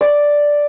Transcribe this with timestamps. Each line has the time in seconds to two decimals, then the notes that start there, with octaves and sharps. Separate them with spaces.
0.01 D5